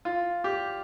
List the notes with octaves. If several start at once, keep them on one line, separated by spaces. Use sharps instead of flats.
F4
G4